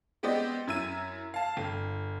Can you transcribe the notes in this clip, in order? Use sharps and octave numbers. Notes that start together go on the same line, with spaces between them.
G#3 B3 C4 G4 D5 D#5
F#2 E4 E6 G#6 D#7
F5 A5
G1